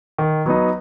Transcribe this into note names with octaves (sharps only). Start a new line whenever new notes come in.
D#3
F#3 B3 D#4